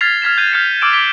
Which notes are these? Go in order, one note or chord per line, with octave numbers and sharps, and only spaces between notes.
F6 G#6 A6 B6 C7 F7
F6 G#6 B6 E7
G6 G#6 D#7
F6 G6 G#6 C7 C#7 F7
D6 E6 F6 D7 E7
D6 B6 D7 G7